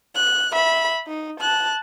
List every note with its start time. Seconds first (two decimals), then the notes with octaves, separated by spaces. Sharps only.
0.15 F#6
0.53 E5 B5
1.07 D#4
1.40 A5 F#6